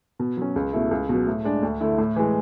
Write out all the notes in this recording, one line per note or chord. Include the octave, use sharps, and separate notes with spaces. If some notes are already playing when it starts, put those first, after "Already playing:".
B2
F#3 C#4
C#2
B2 A3 E4
C#2
B2 F#3
A2
G#3 D4
D2
D3 A3 E4
A2
E3 G#3